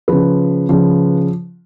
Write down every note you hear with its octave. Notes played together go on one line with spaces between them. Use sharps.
C#3 F3 B4
C#3 F3